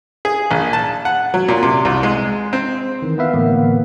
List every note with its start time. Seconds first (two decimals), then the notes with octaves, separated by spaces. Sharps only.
0.25 G#4
0.51 A#1
0.73 A5
1.05 F#5
1.34 F#3
1.48 A#2
1.63 C3
1.85 C2
2.03 G#3
2.53 C4
3.02 D#3 E3
3.18 B3 B4 E5 F5
3.34 A2 D3 E3 A#3 B3